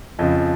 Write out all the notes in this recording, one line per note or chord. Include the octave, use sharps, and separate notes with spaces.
F2 C#3 F3 D#5